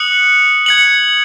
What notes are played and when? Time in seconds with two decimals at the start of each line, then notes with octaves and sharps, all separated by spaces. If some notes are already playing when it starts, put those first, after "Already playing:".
Already playing: D#6 F#6 C#7 F#7
0.66 G#6 C#7 F#7